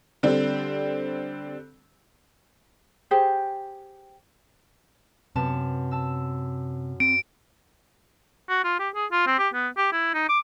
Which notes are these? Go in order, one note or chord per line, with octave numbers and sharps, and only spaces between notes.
D3 G3 C4
G4 G#4 C5
F#2 C3 B3 A5
A5 E6
C4 D7
F#4
F4
G4
G#4
F4
C4
G4
B3
G4
E4
D#4
D6